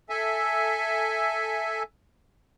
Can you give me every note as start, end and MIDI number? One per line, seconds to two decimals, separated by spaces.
0.09 1.83 69
0.09 1.83 76
0.09 1.83 80